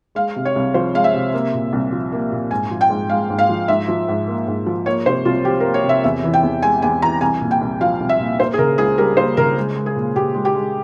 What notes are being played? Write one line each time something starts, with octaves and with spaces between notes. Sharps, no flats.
G#3 F5
C3
C#5
C2
F3 C5
G#3 F5
E5
C3
A#3
A#2
C2
F3
A#3
A#2
G#2 G#5
F3
G5
G#2
G#3 F5
G#2
F5
F3
G#2 E5
F3
G#2
A#3
G#2
F3
A#3 C#5
C3 C5
C2 F4
F3 G4
A#4
A#3
C#5
C3
E5
E2 E5
E3
G5
E2
G#3 G#5
E2 G#5
E3 A#5
C2 G#5
A#2
G5
C2
F3 F5
C2
E5
A#2
A#3 C5
G#4
C#3 A#4
C#2 G#4
G3 A#4
A#3 C5
C#3 A#4
G#3
G#3
G#4
A#2
A#2 G4
G#3
G4
G#3